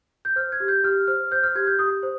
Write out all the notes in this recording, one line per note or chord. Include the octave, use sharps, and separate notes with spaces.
G6
C5 F6
G#6
G4
G6
G4 F6
C5 F6
C5 G6
F6
G4 G#6
G6
G4 D#6
C5